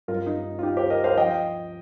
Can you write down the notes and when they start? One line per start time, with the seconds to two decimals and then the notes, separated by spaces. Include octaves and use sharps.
0.08 G2 F4 A#4
0.12 G3
0.26 D#4
0.59 F4
0.63 D#4 G4
0.77 G4 C5
0.90 A#4 D#5
1.04 C5 F5
1.17 F3 D#5 G5